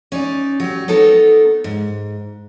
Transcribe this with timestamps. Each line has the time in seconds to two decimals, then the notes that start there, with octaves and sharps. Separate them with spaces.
0.12 C#4 D#4 D5
0.60 F#3 G4
0.88 B3 D#4 A4 A#4 C#5
1.64 G#2